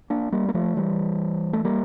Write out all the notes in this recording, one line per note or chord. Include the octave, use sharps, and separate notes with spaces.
A#3 D4
G3 A#3
A#3
F3 A3
E3 G3
A3
G3 A#3